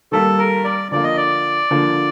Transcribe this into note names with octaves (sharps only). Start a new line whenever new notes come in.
D#3 G3 A#3 A4
A#4
D5
D3 F3 A#3 D5
D#5
D5
D3 F3 A#3